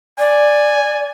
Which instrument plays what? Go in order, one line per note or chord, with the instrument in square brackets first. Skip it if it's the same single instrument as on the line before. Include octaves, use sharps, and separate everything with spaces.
[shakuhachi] D5 [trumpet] G#5